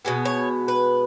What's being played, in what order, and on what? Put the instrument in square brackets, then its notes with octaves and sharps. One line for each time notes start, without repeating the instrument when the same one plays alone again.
[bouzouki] B2 G#3 B3
C#5
B4